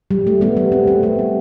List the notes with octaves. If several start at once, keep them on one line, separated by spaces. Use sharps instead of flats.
G3
A3
G3 B3
G3 B3
A3 C4
A3 C4
G3 B3
G3 B3